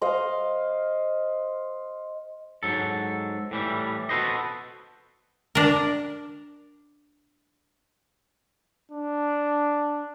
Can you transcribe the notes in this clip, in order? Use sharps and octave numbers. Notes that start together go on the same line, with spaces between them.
C5 D#5 F5
G#2 F#3 A4
A2 E3 G3
F#4 A4 B4 C5 D#5
D4 A#4
D4